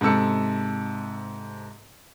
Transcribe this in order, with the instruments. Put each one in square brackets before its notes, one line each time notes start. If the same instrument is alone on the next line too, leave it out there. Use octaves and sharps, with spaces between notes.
[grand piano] G#2 C3 A4 E6 C#7